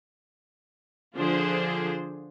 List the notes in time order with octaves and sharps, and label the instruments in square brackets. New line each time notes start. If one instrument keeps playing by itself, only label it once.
[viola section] D3 F3 D4 F4 G#4 C5